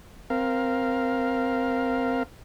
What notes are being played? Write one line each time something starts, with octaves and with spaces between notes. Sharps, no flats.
C4 A#4 F5